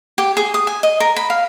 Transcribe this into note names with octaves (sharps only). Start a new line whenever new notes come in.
G4
G#4
D#6
G#5
D#5
A#4
B5
F5